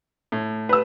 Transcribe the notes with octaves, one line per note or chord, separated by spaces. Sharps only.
A2
B4 E6